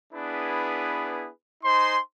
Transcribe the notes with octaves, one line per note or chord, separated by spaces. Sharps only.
B3 D4 E4 G#4 B4
D#4 C5 G#5 C6